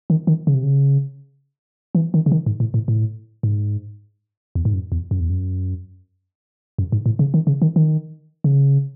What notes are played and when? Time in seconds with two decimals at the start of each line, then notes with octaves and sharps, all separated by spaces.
0.10 D#3
0.27 D#3
0.47 C#3
0.54 C3
0.63 C#3
1.95 E3
2.14 D#3
2.26 C#3
2.32 D#3
2.46 G#2
2.60 A2
2.74 A2
2.88 A2
3.43 G#2
4.55 E2
4.65 G#2
4.74 F#2
4.92 E2
5.11 F#2
5.20 E2
5.30 F#2
6.78 F#2
6.92 G#2
7.06 A2
7.19 C#3
7.34 D#3
7.47 C#3
7.62 D#3
7.76 D#3
8.44 C#3